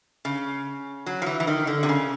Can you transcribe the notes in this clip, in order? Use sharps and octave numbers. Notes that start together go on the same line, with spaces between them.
C#3
F#3
F3
E3
E3
D#3
D3
C3
C#3